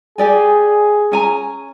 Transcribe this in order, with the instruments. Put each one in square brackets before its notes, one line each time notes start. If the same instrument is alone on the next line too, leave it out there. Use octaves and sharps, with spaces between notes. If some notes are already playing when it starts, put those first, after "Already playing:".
[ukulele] G4 D5 G#5 [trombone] G#4
[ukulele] C#4 G#5 A#5